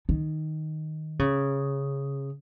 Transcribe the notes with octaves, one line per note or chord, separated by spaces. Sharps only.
D#3
C#3